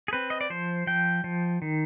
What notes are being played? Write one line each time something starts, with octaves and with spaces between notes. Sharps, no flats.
G#4
C4 B4
D#5
D5
F3 C5
F3 G5
F3
D#3